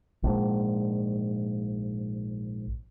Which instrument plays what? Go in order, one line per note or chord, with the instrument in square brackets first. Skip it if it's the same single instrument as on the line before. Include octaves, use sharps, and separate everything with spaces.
[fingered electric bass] A#1 G#2